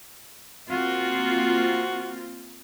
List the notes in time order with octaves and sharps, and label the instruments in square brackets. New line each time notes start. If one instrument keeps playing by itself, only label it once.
[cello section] A#3 C4 F4 [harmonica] F#4